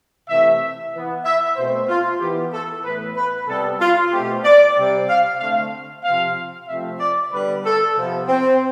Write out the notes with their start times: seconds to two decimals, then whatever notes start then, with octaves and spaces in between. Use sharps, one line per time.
0.28 C3 E3 A3 E5
0.92 E3 B3
1.24 E5
1.56 B2 A3 C4 C5
1.88 F4
2.20 E3 B3 G4
2.52 A4
2.84 A2 E3 B3 B4
3.16 B4
3.47 C3 G3 B3 A4
3.80 F4
4.12 B2 A3 C4 G4
4.44 D5
4.76 C3 G3 C4
5.08 F5
5.40 D3 A3 C4 F5
6.04 C3 F3 C4 F5
6.67 C3 F3 A3 C4 E5
7.00 D5
7.31 D3 G3 B3 B4
7.64 A4
7.95 C3 F3 B3
8.27 C4